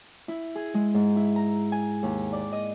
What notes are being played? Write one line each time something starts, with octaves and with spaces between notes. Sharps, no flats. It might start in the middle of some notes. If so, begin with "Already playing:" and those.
E4
G#4
G#3
G#2
E4
A#5
G#5
D#2
D5
D#5